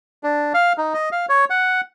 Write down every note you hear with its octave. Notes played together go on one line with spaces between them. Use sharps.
D4
F5
D#4
D#5
F5
C#5
F#5